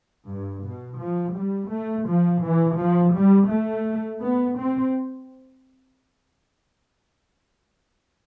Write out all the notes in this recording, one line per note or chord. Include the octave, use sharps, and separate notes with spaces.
G2
B2
F3
G3
A3
F3
E3
F3
G3
A3
B3
C4